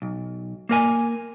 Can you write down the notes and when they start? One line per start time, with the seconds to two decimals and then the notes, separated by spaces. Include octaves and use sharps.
0.02 B1
0.69 A#3 A#4 G#5